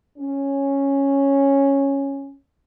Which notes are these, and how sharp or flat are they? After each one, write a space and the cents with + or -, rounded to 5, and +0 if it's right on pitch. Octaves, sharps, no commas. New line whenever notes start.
C#4 -5